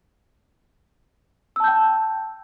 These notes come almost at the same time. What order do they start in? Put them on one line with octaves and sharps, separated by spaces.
E6 A5 G6 G5